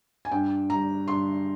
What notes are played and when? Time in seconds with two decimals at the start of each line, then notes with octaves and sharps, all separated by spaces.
0.25 G#5
0.31 G2 G5
0.70 G3 A#5
1.08 G2 C6